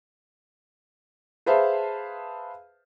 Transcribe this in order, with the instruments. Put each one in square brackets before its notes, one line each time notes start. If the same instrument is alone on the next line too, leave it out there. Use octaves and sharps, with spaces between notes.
[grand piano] G#4 B4 C5 E5 F5 A5